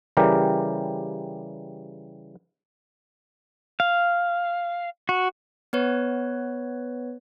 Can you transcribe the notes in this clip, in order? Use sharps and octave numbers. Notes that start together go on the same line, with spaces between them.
C#3 E3 G3 G4 A#4
F5
F#4
B3 B4 C#5